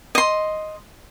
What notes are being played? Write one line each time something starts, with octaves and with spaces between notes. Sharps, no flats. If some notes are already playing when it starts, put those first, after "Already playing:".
D#5 C6